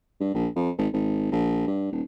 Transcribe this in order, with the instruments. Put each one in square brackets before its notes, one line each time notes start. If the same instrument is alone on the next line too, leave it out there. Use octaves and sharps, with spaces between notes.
[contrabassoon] G2
A#1
F2
G#1
G#1
A#1
G2
D#1